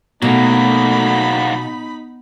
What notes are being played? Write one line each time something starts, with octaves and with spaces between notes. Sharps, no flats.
B2 F#3 A3 A#3 D#4 B5